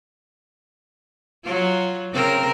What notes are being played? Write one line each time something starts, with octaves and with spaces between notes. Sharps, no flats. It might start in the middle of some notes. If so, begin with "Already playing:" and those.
F#3 F4
C#3 C4 A#4